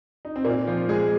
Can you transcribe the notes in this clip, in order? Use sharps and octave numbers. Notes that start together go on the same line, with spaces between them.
D#4
C4
A#2 A#3
F3 F4
G#3 G#4